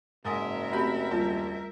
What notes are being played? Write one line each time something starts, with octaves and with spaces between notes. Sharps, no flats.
F#1 G#2 A#4 E5 G#5 D#6
A3 C4 F#4 G4 B5 G6
D#2 G3 F4 A5